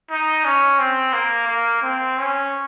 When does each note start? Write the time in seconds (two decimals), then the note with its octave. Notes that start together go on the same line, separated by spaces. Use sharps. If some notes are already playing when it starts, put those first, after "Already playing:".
0.11 D#4
0.45 C#4
0.79 C4
1.13 A#3
1.47 A#3
1.82 C4
2.18 C#4